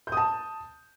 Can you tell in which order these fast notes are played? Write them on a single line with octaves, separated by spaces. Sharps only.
G6 D#6 A5